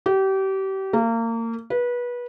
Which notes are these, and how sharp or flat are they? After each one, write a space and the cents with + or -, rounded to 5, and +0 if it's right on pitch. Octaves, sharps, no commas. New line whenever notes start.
G4 -30
A#3 -30
B4 -25